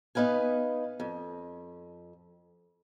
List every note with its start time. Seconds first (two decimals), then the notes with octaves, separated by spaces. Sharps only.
0.15 B3 D#4 B4 F5 G#5
1.00 F2